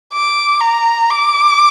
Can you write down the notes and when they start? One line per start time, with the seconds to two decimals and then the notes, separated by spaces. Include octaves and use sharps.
0.13 D6
0.61 A#5
1.11 D6